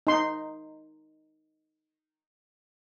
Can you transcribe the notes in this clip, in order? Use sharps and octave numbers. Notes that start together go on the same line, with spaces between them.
D#4 C6